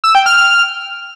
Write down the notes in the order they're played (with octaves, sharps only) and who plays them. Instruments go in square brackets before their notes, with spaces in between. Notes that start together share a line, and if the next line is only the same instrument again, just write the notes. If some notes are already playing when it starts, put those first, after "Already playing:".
[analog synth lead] E6
G5
F6